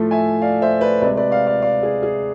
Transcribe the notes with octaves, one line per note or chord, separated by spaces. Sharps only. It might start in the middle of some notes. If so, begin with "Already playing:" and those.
Already playing: A2 F3 A3
E5 G#5
D5 F5
C5 E5
B4 D5
C3 G#3 B4 D5
B4 D5
D5 F5
D5 F5
D5 F5
G#4
G#4